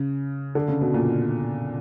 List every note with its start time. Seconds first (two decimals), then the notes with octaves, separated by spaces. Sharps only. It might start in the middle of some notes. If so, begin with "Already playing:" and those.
Already playing: C#3
0.55 D3
0.68 C#3
0.81 B2
0.94 A#2